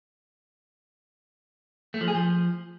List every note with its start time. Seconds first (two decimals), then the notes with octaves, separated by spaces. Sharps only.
1.94 A3
2.01 F3
2.08 G#4
2.15 F3